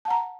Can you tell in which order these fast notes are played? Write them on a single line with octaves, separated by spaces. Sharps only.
A5 F#5 A#5